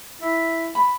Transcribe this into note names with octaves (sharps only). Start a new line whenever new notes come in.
E4
B5